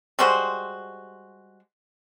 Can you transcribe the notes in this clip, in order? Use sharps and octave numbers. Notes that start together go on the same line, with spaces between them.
G3 G#3 F#4 C5